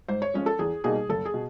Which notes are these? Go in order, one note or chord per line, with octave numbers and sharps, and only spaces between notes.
G#2 C5
C#5
F3 G#3 C#4 F4
A4
E2 G#4
B2 G3 A#3 D#4 G#4
F#1 A4
G#4
B2